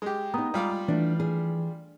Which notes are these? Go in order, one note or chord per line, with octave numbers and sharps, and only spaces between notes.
G#3 G4
B3 D#4 A#5 D#6
G3 G#3 F4 D6
E3 A3 D4
G#4